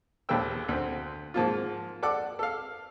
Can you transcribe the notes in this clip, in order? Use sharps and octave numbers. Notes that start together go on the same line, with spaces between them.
A#1 D#2 C4 A4 G5 E6
D2 C4
G#2 F3 A#3 F4
A4 D5 F#5 D6
A4 F5